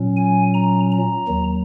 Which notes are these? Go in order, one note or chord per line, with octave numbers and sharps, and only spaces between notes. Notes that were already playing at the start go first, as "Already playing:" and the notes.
Already playing: A#2 F#3 C#4
G#5
A#5
A#5
D#2 D#3 F#3